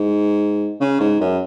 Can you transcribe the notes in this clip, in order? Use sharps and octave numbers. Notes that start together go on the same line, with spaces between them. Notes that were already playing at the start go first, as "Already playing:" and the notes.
Already playing: G#2
C#3
G#2
F#2